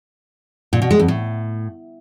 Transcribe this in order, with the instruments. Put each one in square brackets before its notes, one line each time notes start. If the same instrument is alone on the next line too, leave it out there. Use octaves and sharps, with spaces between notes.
[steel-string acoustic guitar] A#2
B2
G#3
F2
A2